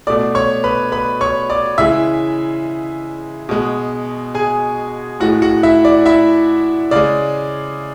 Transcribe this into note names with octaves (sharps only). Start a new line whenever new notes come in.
B2 A3 D5 D6
C#5 C#6
B4 B5
B4 B5
C#5 C#6
D5 D6
C#3 E3 G#3 E5 E6
B2 G#3
G#4 G#5
A2 E3 G#3 F#4 F#5
F#4 F#5
E4 E5
D5
E4 E5
C#3 G#3 D5